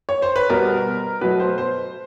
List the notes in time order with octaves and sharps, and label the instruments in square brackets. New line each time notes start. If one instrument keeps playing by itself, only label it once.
[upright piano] C#5
C5
B4
B2 G3 B3 A#4
B2 F#3 A3 B4
C5
C5